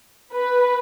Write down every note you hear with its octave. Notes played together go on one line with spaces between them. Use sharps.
B4